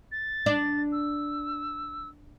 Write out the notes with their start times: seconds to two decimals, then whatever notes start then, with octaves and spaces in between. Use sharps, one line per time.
0.12 A6
0.46 D4
0.92 E6